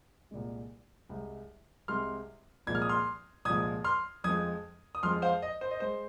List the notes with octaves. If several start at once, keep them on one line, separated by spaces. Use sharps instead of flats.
C2 A#2 G#3
C2 C3 G#3
C2 C3 G#3 C6 F6
C2 A#2 F3 G#3 G#6
F6
D#6
C6 F6
C2 A#2 F3 G#3 D#6 G#6
C6 F6
F2 F3 G#3 D#6 G#6
D#6
F2 F3 G#3 C6 F6
C5 F5
D#5
C5
D#5
G#3 C5